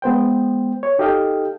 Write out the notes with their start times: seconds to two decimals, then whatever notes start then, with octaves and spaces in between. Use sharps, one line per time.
0.02 G#3 B3 C5 G5
0.83 C#5
0.99 D#4 G4 A4 D#5 F5 G5